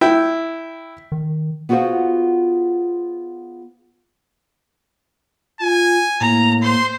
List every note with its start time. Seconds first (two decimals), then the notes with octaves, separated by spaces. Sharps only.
0.01 E4 G5
1.12 D#3
1.69 B3 F4 F#4 G#4 C5 F5
5.61 F4 G#5
6.21 A2 A#3 A#5
6.62 C5 C6